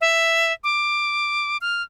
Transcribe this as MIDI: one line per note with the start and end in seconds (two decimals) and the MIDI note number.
0.01 0.53 76
0.64 1.57 86
1.61 1.82 89